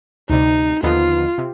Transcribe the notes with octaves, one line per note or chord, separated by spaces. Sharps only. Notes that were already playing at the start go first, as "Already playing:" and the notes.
D2 C3 G3 D#4
D#2 D3 F3 B3 D#4 F4
C3